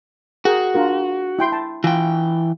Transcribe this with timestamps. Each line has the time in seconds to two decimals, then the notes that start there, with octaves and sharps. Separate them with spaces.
0.45 F#4 G#4 A#4 G5
0.74 D4 F4 A#4
1.39 E4 G5 C6
1.52 A5
1.84 E3 F4 G5